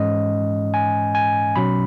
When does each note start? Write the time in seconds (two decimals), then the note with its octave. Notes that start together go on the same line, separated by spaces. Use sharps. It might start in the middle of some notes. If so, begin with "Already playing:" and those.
Already playing: G#2 E3 G#3 C#4 D#5
0.74 G#5
1.15 G#5
1.56 B2 F#3 C#4 B5